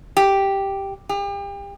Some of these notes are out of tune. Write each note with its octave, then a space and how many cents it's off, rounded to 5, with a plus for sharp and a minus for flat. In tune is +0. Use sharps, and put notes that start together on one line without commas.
G4 +0
G4 +35